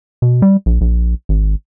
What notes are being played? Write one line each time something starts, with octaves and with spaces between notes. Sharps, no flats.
B2
G3
A#1
A#1
G#1